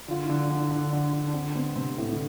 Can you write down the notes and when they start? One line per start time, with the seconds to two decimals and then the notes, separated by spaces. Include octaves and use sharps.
0.08 D3 F4
0.24 E4
0.29 D3
0.40 D4
0.50 D3
0.56 D4
0.71 D3 D4
0.93 D3
1.13 D3
1.27 D4
1.34 D3 C4
1.55 B3 C4
1.76 C3 C4
1.97 A2 C4
2.13 D3